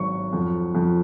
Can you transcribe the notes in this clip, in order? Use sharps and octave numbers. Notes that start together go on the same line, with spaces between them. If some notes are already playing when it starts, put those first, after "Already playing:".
Already playing: G#1 F#3 C#6
F2
F2